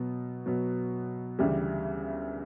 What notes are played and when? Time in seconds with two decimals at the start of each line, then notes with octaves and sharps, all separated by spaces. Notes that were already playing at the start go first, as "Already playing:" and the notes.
Already playing: B2 F#3 B3
0.46 B2 F#3 B3
1.39 D2 C#3 E3 G3